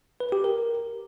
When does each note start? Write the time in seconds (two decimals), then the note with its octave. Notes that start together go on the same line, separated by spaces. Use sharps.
0.20 B4
0.32 G4
0.44 A#4